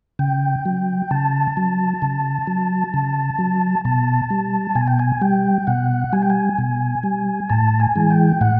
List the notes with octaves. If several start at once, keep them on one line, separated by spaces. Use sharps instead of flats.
C#3 G5
F#3
C#3 A5
F#3
C#3
F#3
C#3
F#3
B2 A5
G3
B2 G#5
G5
G#5
G3 G5
B2 F#5
G3 G#5
G5
G#5
B2
G3
A2 A5
G#5
E3 G#3
G5
A2 F#5